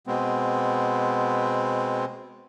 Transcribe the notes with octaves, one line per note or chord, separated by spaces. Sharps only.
B2 G#3 B3 C4